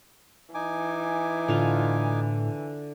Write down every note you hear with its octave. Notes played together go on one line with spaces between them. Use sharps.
E3 D#4 G#5 D6
A2 D3 F4